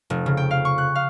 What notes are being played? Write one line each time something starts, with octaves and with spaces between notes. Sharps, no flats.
F1
C#3
G5
F5
C#6
F#6
F5